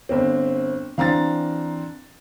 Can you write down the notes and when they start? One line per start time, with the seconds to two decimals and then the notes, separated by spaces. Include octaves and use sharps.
0.09 G1 C4
0.98 E3 C4 D4 F5 A#5 A6